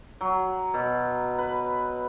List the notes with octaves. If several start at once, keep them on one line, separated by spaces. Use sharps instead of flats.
F#3
B2
B4